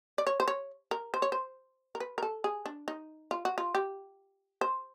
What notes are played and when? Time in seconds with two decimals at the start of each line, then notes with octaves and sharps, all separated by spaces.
0.18 D5
0.27 C#5
0.40 C5
0.48 C#5
0.91 A#4
1.14 C5
1.22 C#5
1.32 C5
1.95 A#4
2.00 B4
2.18 A#4
2.23 A4
2.44 G#4
2.66 D4
2.88 D#4
3.31 F4
3.45 F#4
3.58 F4
3.75 G4
4.61 C5